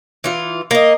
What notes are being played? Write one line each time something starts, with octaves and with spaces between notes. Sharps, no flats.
E3 F4
A#3 D#5